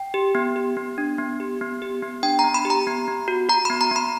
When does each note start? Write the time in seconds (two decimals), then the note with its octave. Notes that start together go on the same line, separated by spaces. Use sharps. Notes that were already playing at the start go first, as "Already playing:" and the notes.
Already playing: G5
0.14 G4
0.35 B3
0.56 G4
0.77 B3
0.98 D4
1.18 B3
1.40 G4
1.61 B3
1.82 G4
2.03 B3
2.23 D4 G5
2.39 A#5
2.44 B3
2.54 B5
2.65 G4
2.70 A#5
2.87 B3
3.08 B3
3.28 F#4
3.49 F#4 A#5
3.65 B3 B5
3.81 A#5
3.91 B3 B5